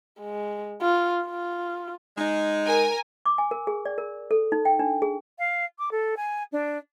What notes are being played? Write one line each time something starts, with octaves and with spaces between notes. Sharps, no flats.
G#3
F4
F4
G#3 D#4
A#4 G#5
D6
G#5
A#4
G#4
D5
A#4
A4
D#4
G5
D4
G#4
F5
D6
A4
G#5
D4